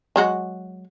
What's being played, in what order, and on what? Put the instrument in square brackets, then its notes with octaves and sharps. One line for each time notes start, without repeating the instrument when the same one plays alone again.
[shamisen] F#3 G#3 F#4